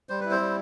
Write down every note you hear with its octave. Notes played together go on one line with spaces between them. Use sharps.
G3 C5
E4 B4
C4 C5
G3